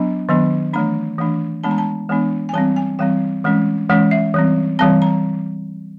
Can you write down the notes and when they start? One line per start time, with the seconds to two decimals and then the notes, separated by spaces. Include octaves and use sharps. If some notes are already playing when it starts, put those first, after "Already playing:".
Already playing: F#3 B3 D4 A#5
0.29 D#3 F#3 B3 D4
0.73 E3 A3 D4 A#5
1.19 E3 A3 D4
1.63 E3 G#3 B3 D4 A5
1.71 A#5
1.78 A5
2.09 E3 G#3 B3 D4
2.49 G#5
2.54 E3 G3 C4 A5
2.76 G#5
2.99 E3 G3 C4 G5
3.44 E3 G#3 C#4
3.89 E3 G#3 C#4
4.11 E5
4.34 E3 G3 C4
4.79 E3 G3 C4 A5
5.02 A#5